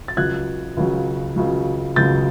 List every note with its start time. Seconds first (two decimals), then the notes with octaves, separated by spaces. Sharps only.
0.08 A6
0.17 C#2 C#3 F#3 F#6 G#6
0.77 C#2 C#3 F#3
1.36 C#2 C#3 F#3
1.96 C#2 C#3 F#3 G6 A6